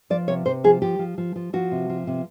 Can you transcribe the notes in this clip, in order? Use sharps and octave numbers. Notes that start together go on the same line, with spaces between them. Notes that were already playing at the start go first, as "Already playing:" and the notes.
F3 D5
C3 C#5
C3 C5
F3 G#4
F3 G4
F3
F3
F3
F3 F#4
C3
F3
C3